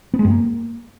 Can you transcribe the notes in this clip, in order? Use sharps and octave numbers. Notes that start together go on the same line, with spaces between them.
B3
G#3
F#2
A#3